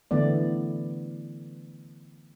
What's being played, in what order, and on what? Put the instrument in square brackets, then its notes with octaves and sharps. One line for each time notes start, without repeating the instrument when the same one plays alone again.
[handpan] D3 E3 A3 B3 D5